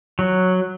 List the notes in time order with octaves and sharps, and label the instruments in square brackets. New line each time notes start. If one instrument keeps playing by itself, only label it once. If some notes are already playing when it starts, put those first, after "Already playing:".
[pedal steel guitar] F#3